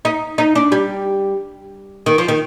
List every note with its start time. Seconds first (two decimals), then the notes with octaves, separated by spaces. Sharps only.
0.05 D#4
0.38 D#4
0.55 D4
0.72 G3
2.06 D#3
2.18 F3
2.28 D#3